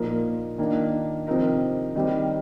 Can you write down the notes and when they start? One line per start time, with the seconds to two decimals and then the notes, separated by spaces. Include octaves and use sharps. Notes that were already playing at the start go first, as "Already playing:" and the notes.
Already playing: A#2 F3 A#3 D#4 A#4
0.58 D#3 A#3 D4 F4
1.27 C3 F3 C4 D#4 A#4
1.96 D#3 G3 C4 G4